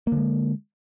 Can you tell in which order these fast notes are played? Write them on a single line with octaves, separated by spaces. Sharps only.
A#3 D3 G#3